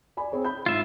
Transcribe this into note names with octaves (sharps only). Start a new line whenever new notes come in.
D5 G#5 B5
C4 G#4 C#5
B5 G6
G#2 F4 E5